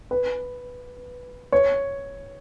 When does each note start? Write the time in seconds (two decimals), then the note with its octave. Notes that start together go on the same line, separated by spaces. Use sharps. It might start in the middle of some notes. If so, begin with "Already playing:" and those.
0.11 B4
1.52 C#5